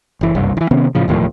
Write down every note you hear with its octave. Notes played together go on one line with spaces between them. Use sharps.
F#1 E3
F#1 C2 G2
D#3 E3
C3 D#3 B3 C#4
A2 C#3 F3
E1 D#2 A2 F3